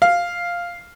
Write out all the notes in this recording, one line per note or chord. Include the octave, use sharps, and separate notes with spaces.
F5